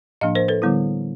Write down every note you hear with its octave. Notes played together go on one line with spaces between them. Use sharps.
A2 F3 A#3 D4 D#5 F5
A#4 C5
A4 B4
D3 G3 B3 E4